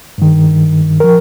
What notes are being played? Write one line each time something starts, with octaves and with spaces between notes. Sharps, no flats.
G2 D#3
F3 A#4